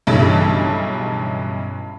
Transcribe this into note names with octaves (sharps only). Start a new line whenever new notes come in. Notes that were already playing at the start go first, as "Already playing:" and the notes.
B1 G2 C#3 E3 A4 A5